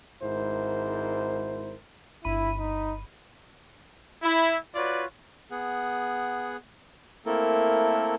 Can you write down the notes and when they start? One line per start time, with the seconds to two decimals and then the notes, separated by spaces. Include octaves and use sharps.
0.23 G#1 G#2 E4 A#4 C5
2.24 G1 E4 B5 D#7
2.59 D#4
4.23 E4
4.75 F4 F#4 B4 C#5 D5
5.51 B3 G#4 F#5
7.26 A3 A#3 C4 E4 A4 A#4